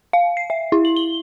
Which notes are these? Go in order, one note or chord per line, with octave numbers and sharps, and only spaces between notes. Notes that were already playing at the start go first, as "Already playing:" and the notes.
F5
C7
E5
E4
F#7
G7